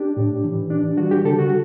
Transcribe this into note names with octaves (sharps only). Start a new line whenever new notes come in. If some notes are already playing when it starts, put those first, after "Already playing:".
Already playing: D4 G4
A2
E3
D4
G3 F#4
G4
D3 A4
F#4